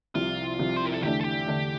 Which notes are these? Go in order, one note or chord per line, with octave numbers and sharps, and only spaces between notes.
C2 C3 F3 F4
C2 C3 F3
C5
A#4
A4
E2 D3 A3 D4 G4
A4
G4
E2 D3 A3 D4